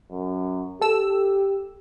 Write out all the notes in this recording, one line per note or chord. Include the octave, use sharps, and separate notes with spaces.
F#2
G4 A4 E6